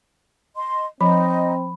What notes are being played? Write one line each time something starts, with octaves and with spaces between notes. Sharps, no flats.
D#5 C6
F3 C4 D#4 D#5 B5